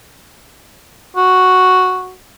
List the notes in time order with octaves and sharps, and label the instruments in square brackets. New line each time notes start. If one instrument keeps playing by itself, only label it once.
[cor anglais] F#4